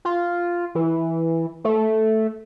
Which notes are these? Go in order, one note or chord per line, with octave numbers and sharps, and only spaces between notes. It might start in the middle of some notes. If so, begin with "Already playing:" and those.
F4
E3
A3